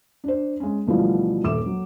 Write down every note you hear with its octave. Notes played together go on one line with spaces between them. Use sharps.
D4 C5
G#3 C#4
D2 B2 E3 F3 G3
D#1 A4 E5 D6 E7
F#3